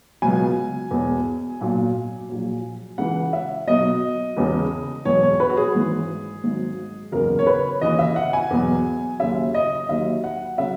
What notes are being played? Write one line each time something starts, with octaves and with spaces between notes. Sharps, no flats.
C#2 B2 F#3 G#5
E1 E2 B2
B1 A#2 F#3
A#1 A#2 F#3
C#2 C#3 E3 F#5
E5
B1 B2 F#3 D#5
E1 E2 C#3
E1 E2 B2 F#3 C#5
C#5
B4
F#4
G#4
G#1 G#2 E3
G#1 G#2 F#3
F#1 E2 C#3 A#4
C#5
B4
D#2 C#3 E3 D#5
E5
F#5
G#5
E2 B2 F#3
D#2 C#3 F#3 E5
D#5
D#2 D#3 F#3 E5
F#5
C#3 F#3 E5